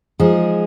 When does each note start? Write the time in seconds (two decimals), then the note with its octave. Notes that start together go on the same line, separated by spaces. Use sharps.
0.20 F3 G#3 D#4 G#4